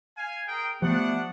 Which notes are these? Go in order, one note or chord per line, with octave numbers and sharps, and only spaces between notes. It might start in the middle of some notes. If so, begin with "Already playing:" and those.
F5 G#5
G#4 A#4 G5
F3 G3 A3 B3 D4 F#5